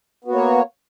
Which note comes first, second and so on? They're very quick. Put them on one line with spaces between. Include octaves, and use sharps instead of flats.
B3 F#4 A#3 C#5